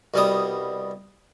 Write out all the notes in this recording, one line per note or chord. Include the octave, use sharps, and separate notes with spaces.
C2 B2 G3 B3 G5 D#6